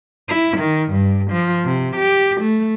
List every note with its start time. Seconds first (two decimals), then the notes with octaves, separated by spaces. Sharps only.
0.28 E4
0.57 D#3
0.91 G2
1.31 F3
1.65 C3
1.96 G4
2.41 A3